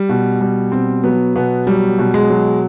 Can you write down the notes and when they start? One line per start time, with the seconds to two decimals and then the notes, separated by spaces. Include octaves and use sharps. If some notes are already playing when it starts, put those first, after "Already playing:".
Already playing: G3
0.09 B2
0.41 G3
0.72 B2 C4
1.04 F#3 B3
1.36 B2 B3
1.67 F#3 G3
1.99 B2
2.14 G#3
2.30 F#3